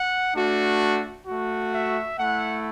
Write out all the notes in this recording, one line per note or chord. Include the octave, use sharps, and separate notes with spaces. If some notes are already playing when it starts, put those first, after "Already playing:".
Already playing: F#5
A3 D4 F#4
A3 F#4
E5
A3 E4 F#5